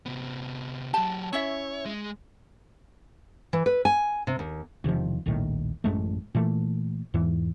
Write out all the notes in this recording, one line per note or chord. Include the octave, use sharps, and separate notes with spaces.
C3 B3
F#3 G4 A5
C#4 E4 C#5 E5
G#3 G#4
E3
B4
G#5
C3
D#2
E1 C3 D#3 F3
D#1 A#1 A2 D#3
A1 F#2 G#3 A3
A#2 E3 A3
E2 G#2 E3